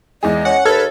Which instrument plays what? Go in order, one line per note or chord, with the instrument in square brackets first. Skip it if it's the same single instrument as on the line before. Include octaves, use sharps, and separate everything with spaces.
[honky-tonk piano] E2 G#3 G#4 [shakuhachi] D#5
[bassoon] C#4 [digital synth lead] F#5
[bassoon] D#2 [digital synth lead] A4 [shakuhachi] B4 [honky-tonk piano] F6 G#6 A6